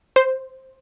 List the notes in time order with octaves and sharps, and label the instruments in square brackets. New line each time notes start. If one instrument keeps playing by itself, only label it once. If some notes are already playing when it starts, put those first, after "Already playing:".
[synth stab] C5